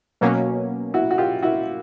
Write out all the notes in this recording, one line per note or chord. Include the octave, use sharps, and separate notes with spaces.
B2 F#3 A#3 C#4
E4 F#4
F#4
F4 G4
E4 F#4